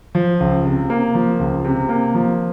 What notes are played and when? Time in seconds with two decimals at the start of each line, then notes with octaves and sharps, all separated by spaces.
0.15 F3
0.40 C#2
0.65 C3
0.90 A#3
1.15 F3
1.40 C#2
1.65 C3
1.89 A#3
2.15 F3